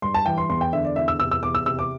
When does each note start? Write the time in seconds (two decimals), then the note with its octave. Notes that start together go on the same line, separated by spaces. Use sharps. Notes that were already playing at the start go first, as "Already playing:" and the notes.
0.02 G2 C6
0.14 A5
0.26 E3 G5
0.38 C6
0.49 E2 C6
0.61 G5
0.73 D3 E5
0.85 D5
0.96 E2 E5
1.08 E6
1.19 C3 E6
1.31 E6
1.43 E2 D6
1.55 E6
1.66 C3 E6
1.79 D6